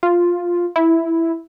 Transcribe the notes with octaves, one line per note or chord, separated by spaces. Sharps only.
F4
E4